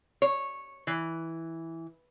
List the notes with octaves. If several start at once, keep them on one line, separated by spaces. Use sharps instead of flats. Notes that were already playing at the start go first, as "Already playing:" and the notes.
C#5
E3